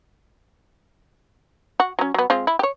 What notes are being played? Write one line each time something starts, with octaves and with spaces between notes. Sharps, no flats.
F#4
F#3 C#4
F#3 B3
G#3 C4 F4
E4
G4 C#5